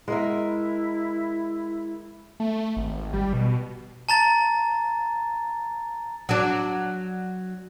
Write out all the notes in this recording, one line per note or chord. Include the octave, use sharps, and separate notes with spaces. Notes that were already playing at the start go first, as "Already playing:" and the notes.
G#3 E4 A#4 E5
A3
G#1
G3
B2
A5 A#5 A6
F#3 D4